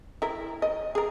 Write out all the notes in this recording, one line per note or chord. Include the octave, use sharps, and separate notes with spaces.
E4 A#4
D#5
G#4 A#4